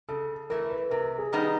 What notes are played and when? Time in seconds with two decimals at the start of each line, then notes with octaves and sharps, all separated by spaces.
0.09 C#3 A4
0.50 E3 A3 A#4
0.70 B4
0.91 C3 A#4
1.18 G#4
1.33 D#3 G3 B3 D#4